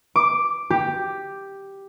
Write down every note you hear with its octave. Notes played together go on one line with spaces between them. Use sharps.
D6
G4